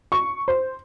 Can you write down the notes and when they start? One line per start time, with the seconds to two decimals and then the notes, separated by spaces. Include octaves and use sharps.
0.12 C#6
0.48 C5